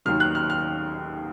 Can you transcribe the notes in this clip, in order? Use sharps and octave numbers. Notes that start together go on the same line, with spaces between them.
D#2 D#3 F#3 F6
F#6
F6
F6